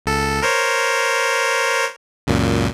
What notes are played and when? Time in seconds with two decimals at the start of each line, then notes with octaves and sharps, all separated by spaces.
0.06 C#2 A4
0.42 A#4 C5 C#5
2.27 C#2 F#2 A#2